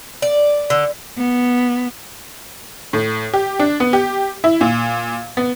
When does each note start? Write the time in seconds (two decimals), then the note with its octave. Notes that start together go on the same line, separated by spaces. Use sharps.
0.22 D5
0.70 D3
1.18 B3
2.93 A2
3.34 G4
3.59 D4
3.80 B3
3.93 G4
4.44 E4
4.61 A#2
5.37 B3